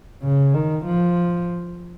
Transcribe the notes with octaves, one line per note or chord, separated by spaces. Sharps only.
C#3
D#3
F3